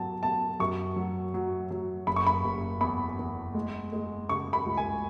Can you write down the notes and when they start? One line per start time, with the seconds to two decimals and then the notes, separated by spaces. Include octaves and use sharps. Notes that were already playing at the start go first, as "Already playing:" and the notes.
Already playing: B2 F#3 A5
0.23 B2 A5
0.60 F#2 C#6
0.96 F#3
1.34 F#3
1.70 F#3
2.07 F#1 B5
2.16 C#6
2.26 B5
2.45 F#1
2.81 E2 B5
3.19 E2
3.54 G#3
3.93 G#3
4.29 C#3 C#6
4.53 B5
4.66 C#2
4.77 G#5